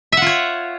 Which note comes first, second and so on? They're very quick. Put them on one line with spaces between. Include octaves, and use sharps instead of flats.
E5 F#5 F4 C#5